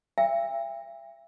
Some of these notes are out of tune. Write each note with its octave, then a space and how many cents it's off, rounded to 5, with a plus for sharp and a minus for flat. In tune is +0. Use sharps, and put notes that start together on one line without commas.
E5 +40 G5 +40 E6 +0